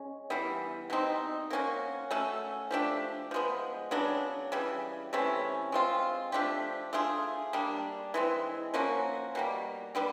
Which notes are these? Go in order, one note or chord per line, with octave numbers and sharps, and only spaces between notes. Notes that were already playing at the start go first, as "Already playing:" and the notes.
Already playing: G#3 C#4
E3 G3 B3
B2 G3 C4 D#4
A#3 C#4 F#4
A3 C#4 F#4 A4
F3 A3 D4 G4
F3 G#3 B3
C#3 F#3 B3 D4
C#3 E3 G3
C3 E3 A3 C#4
G#3 C4 F4
F3 A3 D4 G4
A3 D4 F4 G#4
G3 A#3 D4
E3 G#3 C4
F3 A#3 C#4 F#4
B2 G3 A#3
D3 G3 B3